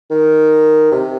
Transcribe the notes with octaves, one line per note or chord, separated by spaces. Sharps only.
D#3
C3